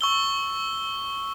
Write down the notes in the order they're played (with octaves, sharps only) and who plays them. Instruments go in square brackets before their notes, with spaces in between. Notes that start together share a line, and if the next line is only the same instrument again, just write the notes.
[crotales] C#6 E6 G7